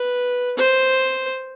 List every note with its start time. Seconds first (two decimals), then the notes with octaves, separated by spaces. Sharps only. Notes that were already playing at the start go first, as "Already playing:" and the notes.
Already playing: B4
0.57 C5